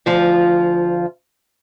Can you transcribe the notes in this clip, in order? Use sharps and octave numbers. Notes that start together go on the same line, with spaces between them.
D2 F3 F4